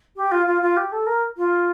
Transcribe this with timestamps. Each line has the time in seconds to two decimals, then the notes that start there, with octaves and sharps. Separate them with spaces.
0.16 G4
0.31 F4
0.46 F4
0.61 F4
0.76 G4
0.92 A4
1.06 A#4
1.37 F4